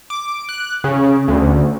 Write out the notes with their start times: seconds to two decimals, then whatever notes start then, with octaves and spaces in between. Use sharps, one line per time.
0.10 D6
0.49 F#6
0.84 C#3
1.28 D2